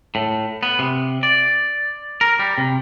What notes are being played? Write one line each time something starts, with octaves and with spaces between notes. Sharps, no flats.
A2
B3
C3
D5
A#4
G3
C3